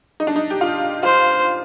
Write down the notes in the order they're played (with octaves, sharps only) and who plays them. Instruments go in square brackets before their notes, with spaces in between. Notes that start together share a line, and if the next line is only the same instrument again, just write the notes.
[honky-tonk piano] D#4
D4
D#4
G4
F4
[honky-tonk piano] F4 [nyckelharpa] C5